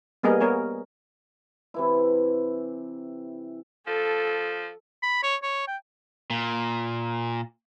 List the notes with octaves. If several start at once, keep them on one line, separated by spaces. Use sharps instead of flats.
G3 A#3 B3 G#4 A#4 D#5
B3 A#4 C#5 G#5
C3 E3 E4
F3 A4
B5
C#5
C#5
G5
A#2